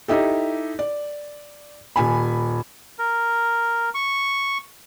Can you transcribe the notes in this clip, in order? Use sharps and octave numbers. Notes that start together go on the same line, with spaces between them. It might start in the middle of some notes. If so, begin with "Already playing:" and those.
D#4 E4 G4 A4
D5
D#1 G#5 B5
A#4
C#6